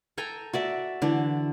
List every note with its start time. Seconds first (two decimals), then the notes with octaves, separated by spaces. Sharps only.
0.18 A4 G5 G#5 A#5
0.53 F#4 D5 E5
1.02 D3 E3 D4